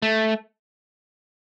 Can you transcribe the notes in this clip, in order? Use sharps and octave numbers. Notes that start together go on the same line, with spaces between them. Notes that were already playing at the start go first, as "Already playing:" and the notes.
A3